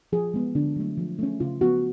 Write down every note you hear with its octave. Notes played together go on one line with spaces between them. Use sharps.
F3 G#4
G#3 B3
D3 D4
F#3 A3
F3
A3 C#4
C#3 F4
F3 B3 F#4